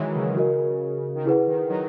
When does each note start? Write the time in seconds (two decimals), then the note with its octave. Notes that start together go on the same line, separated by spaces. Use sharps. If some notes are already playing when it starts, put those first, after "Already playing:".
Already playing: D#3 E3 F#3 G#3 C#5 E5
0.15 C#3
0.37 F#4 A#4 D#5
1.15 D#3
1.25 C#3 E4 G#4 B4 F#5
1.47 D#3
1.69 D#3 F#3